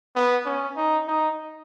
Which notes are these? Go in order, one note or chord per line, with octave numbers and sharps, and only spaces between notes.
B3
C#4
D#4
D#4